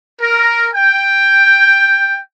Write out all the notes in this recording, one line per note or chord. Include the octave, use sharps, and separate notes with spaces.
A#4
G5